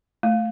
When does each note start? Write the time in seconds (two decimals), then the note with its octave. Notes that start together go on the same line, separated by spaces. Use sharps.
0.23 A3